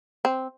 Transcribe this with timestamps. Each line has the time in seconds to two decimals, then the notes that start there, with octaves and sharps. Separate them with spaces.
0.25 C4